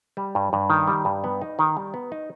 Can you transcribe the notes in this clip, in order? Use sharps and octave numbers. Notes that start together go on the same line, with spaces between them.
G3
G2
G2
D#3
G3
G2
B3
D#4
D#3
G3
B3
D#4